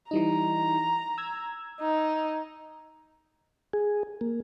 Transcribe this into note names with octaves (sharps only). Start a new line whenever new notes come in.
E3 G3 D#4 A#5
E6 G#6
D#4
G#4
A#3